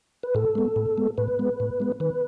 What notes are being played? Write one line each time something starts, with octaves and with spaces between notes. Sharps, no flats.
B4
A2 A4
G#3 B3
A2
G#3 B3
A2 B4
G#3 B3
A2
G#3 B3
D#3 B4